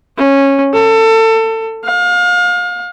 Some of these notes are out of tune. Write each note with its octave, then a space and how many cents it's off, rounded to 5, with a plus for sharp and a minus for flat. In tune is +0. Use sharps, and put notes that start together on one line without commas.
C#4 -10
A4 +25
F5 +35